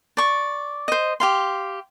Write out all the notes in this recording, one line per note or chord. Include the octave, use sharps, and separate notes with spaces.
D5 C#6
C5 D#5
G4 F5 C6